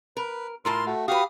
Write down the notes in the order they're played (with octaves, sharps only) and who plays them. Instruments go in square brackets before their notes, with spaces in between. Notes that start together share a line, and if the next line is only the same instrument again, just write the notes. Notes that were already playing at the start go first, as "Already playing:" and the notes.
[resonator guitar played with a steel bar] A#4 [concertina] B4
[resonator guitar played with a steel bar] A2 F4 A5 [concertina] A#4 C6
[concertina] A3 F#4
[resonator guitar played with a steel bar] F#4 B4 [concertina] G4 F5 D#6